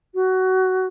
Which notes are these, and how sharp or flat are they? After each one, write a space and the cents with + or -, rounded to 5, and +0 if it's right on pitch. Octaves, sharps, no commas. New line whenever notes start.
F#4 +15